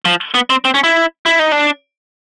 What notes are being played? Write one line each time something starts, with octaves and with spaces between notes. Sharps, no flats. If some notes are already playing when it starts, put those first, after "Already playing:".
F3
B3
C4
C4
C#4
E4
E4
D#4
D4